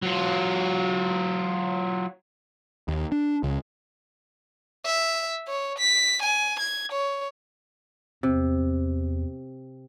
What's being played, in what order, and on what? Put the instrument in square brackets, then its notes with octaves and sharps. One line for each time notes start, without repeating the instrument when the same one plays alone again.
[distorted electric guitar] F#3 F4
[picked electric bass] D#2
D4
C#2
[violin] E5
C#5
B6
G#5
G#6
C#5
[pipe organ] E2 [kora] C3